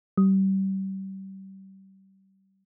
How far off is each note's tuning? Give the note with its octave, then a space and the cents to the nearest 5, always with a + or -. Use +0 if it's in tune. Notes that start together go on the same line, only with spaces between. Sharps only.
G3 -30